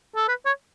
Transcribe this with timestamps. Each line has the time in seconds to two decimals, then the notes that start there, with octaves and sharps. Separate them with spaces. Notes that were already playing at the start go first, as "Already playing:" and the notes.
0.16 A4
0.28 B4
0.46 C#5